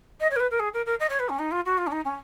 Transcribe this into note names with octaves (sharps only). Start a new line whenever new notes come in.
D#5
C#5
A#4
B4
A#4
G#4
A#4
A#4
D#5
C#5
B4
C#4
D#4
F4
F#4
F4
C#4
D#4
C#4